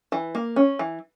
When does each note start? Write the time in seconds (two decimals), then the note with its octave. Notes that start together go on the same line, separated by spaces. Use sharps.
0.12 E3
0.35 A#3
0.56 C#4
0.79 E3